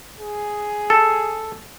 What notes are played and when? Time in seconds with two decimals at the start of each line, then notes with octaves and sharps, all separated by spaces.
0.20 G#4
0.90 A4